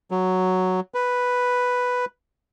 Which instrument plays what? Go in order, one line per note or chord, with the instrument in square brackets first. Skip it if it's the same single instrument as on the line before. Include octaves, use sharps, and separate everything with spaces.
[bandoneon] F#3
B4